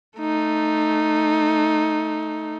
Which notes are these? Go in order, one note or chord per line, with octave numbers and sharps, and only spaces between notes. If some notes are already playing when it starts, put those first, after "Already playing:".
A3 D#4